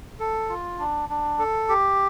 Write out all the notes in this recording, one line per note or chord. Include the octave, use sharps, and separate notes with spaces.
A4
F4
D4
D4
A4
G4